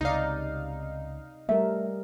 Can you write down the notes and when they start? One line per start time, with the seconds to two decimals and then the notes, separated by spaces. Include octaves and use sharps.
0.01 C#2 C3 D#4 D5 F5
1.49 G3 A3 A#4 E5